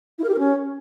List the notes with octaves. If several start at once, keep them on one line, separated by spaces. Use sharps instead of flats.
E4
A#4
G4
A#4
C#4